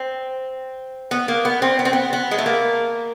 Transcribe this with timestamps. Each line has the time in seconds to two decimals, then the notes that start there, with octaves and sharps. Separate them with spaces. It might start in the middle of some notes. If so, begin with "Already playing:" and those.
Already playing: C4
1.11 B3
1.28 A#3
1.45 B3
1.62 C4
1.79 B3
1.85 C4
1.93 B3
2.13 B3
2.31 G#3
2.38 A3
2.46 A#3